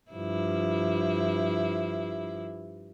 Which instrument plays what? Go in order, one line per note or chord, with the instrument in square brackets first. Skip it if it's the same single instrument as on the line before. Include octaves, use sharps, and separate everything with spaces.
[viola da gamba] G2 F3 E4